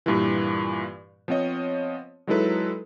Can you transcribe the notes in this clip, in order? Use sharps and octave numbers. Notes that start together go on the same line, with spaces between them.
G2 A#2 E3
F3 B3 C4 C#5 D#5
F#3 G#3 D#4 E4 A4 B4